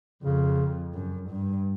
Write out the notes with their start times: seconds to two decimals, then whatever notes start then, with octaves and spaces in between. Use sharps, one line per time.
0.23 F2 C#3
0.94 F#2
1.30 G2